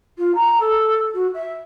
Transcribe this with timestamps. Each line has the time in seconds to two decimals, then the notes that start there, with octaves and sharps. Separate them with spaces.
0.18 F4
0.35 A#5
0.60 A4
1.14 F#4
1.34 E5